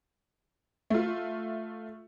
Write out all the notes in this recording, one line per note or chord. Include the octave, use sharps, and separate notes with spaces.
A3 F4